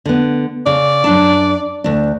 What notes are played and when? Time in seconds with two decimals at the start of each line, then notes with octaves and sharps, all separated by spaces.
0.05 D3 B3
0.66 C#3 D5
1.04 F#2 D4 A5
1.84 D2 D4